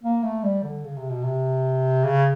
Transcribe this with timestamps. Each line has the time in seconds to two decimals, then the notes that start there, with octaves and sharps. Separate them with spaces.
0.03 A#3
0.24 A3
0.43 G3
0.63 D3
0.84 C#3
0.97 C3
1.10 B2
1.24 C3
2.04 C#3